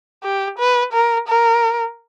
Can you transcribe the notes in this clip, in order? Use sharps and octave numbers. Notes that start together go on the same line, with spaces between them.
G4
B4
A#4
A#4